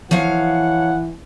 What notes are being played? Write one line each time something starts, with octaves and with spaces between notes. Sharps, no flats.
E3 F3 C#5 F5 F#5